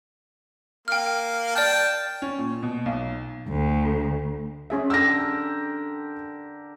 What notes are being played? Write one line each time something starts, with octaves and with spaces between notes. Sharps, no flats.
A#3 G5 F6
D5 G5 A5 F6
C#4
A#2
B2
B1
D2
C#4 G#4 E5
D3 G4 A#4 E6 A#6